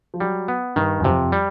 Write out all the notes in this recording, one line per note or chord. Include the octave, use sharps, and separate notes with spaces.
F3
F#3 G3
B3
G2 D#3
F#2
F2 C3
G3